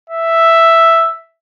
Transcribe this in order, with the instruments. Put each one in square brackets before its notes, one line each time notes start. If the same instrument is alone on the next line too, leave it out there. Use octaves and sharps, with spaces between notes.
[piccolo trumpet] E5